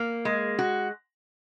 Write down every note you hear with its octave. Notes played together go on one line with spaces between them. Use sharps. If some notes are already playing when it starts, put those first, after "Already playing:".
Already playing: A#3
G#3
F#4